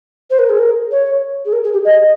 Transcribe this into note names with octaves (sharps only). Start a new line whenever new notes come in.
C5
A#4
G#4
A#4
C#5
G#4
A#4
G#4
G4
D#5